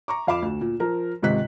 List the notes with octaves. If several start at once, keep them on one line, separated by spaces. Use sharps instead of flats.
A#5 C#6 D6
F2 F5 B5 D6 E7
D2
A#2
F3 A#4
C#2 G#2 C3 D#3 F#6 B6